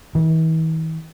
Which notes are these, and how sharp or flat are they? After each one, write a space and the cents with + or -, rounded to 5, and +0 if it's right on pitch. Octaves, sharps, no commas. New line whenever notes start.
E3 -45